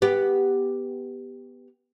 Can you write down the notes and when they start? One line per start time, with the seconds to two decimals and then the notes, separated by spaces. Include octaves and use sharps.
0.02 B3 G4